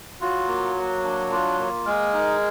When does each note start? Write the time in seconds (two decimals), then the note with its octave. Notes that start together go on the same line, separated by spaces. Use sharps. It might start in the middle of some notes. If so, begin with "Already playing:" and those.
0.20 F#3 F4
0.48 A#3
0.76 A#3
1.04 D4
1.31 F4
1.59 A#3
1.85 G#3 A#4
2.14 D#4